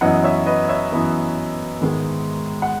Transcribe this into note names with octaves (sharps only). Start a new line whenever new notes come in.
F#2 E3 B3 D#5 F#5
C#5 E5
B4 D#5
C#5 E5
F#2 E3 B3
G#2 D#3 G#3 B3
F#5